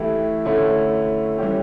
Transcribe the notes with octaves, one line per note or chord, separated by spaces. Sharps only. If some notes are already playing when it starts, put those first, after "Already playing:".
Already playing: E3 A3 E4 G4
D3 A3 C#4 E4
E3 G3 C#4 G4